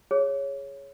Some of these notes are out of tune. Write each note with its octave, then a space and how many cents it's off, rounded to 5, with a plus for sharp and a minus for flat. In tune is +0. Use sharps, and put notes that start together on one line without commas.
G#4 +0 C#5 +0